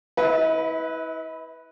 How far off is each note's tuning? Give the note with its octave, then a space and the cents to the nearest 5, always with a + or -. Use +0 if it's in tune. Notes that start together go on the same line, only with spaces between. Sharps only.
E4 -30 B4 +0 D#5 +40